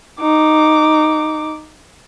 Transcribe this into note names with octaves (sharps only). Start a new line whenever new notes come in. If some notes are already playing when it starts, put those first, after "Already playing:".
D#4 D6